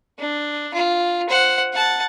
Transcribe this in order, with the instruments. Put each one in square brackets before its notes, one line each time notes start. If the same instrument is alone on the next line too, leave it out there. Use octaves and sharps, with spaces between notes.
[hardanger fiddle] D4
F4
C5 F#5
F#5 A5